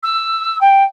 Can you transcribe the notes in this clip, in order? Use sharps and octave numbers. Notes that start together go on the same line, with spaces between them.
E6
G5